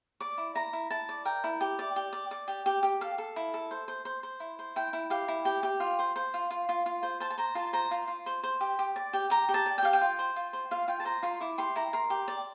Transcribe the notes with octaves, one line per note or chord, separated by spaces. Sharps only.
D5 D6
E4
E4 A#5
E4
E4 A5
D5
A#4 G5
E4
G4
D5
G4
D5
D5
G4
G4
G4
A4 F5
A4
E4
A4
C5
C5
C5
C5
E4
C5
E4 G5
E4
G4 F5
E4
G4
G4
F4
C5
C5
F4
F4
F4
F4
C5
C5 A5
A5
C5 A#5
F4 A5
C5 A#5
F4 C6
F4
C5
C5
G4
G4
D5
G4
G4 A#5
G4
A5
D5
G5
G4 F5
G5
F4
C5
F4
C5
F4 F5
F4 G5
A5
C5 A#5
F4 C6
E4 D6
G4 C6
E4 A#5
A#4 C6
G4
D5